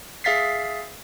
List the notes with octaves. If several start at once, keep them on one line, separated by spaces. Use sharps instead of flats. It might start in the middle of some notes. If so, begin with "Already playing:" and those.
G#4 E5 F5 A6 B6 C7